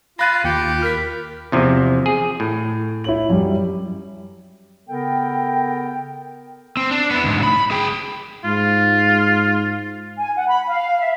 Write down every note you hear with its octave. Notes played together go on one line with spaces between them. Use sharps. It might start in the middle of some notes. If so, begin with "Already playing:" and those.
F4 F5 B5 F#6 A6 A#6 D#7
D#2 F4 G4 G5 C#7
A#4 F6 B6
E2 C3 F3
G#4
A2
E4 C#5 F#7
F#2 G3
C#3 B3 A4 A#4 G5
C4
D4
B3 E4
D2 G#2
B5
G#4 G5
G#2 F4
G#5
F#5
B5
F5
E5